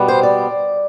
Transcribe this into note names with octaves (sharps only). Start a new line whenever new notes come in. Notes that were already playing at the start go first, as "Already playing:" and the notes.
Already playing: B2 G3 B3
C5
D5